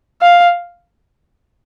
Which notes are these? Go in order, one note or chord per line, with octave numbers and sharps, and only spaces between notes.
F5